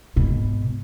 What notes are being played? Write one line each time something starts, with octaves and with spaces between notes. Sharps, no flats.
G#1 B2